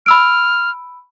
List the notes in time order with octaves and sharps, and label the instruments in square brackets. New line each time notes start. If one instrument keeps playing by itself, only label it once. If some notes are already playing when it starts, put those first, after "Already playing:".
[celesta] B5 E6 D7 [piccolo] F6